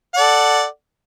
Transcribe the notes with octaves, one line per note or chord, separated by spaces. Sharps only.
A4 D5 F#5